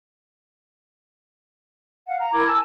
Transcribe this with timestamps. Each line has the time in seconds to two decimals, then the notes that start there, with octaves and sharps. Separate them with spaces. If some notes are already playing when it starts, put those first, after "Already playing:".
2.07 F5 F#5
2.19 A#5
2.33 E4 A#4 D6 G#6
2.47 G#5 A5 E6